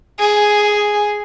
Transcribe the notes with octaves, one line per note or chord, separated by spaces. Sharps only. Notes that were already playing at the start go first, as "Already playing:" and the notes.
G#4